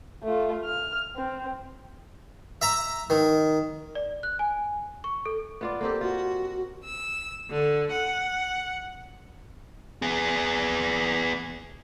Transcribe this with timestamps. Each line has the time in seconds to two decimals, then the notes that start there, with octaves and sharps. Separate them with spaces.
0.23 A3 F4
0.64 F6
1.16 C4
2.62 E5 A#5
3.10 D#3
3.95 D5
4.23 F#6
4.39 G#5
5.04 C#6
5.26 A4
5.61 B3 F4 D5
5.81 A#3 C4 G4 A4
6.01 F4 F#4
6.84 E6
7.51 D3
7.92 F#5
10.02 B3 G#4